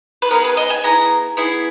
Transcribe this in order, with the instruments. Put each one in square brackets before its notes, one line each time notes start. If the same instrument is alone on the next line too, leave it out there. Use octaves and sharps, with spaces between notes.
[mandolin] B4
B3 E4 G#4 A#4
B4
D#5
G#5
B3 E4 G#4 A#5
B3 E4 G#4